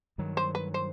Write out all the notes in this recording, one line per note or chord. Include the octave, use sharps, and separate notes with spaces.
G2 D#3 F#3
C5
B4
C5